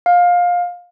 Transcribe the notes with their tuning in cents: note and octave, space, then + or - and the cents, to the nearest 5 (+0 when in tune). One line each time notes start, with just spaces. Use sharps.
F5 +20